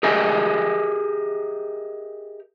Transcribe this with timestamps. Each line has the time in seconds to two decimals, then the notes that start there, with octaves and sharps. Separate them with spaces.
0.03 G4 G#4 A#4 D#5 E5 G#5